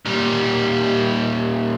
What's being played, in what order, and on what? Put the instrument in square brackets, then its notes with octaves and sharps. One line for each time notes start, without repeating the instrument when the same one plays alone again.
[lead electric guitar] A#2 G3